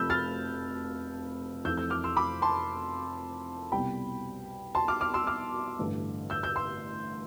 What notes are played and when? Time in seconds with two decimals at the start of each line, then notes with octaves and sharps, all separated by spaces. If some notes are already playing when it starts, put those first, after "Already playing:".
Already playing: F1 F2 C3 F3 A3 B5 E6 G6
0.10 F6 A6
1.65 F2 E3 A3 E6 G6
1.77 E6 G6
1.90 D6 F6
2.04 C6 E6
2.17 B5 D6
2.42 A5 C6
3.72 C2 B2 G3 G5 B5
4.75 A5 C6
4.88 D6 F6
5.01 D6 F6
5.14 C6 E6
5.27 D6 F6
5.79 A1 G2 D3
6.30 E6 G6
6.43 E6 G6
6.56 C6 E6